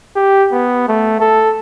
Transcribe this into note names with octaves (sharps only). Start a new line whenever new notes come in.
G4
B3
A3
A4